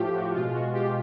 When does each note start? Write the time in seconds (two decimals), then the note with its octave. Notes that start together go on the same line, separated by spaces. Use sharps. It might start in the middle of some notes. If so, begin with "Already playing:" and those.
Already playing: A2 F3 A3 F4 G4
0.14 F#4
0.33 B2 G#3 F4
0.52 F#4
0.73 B2 G#3 F4 G4